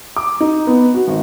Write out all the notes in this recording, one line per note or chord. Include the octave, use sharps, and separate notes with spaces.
D6
D#4
B3
F#4
G#1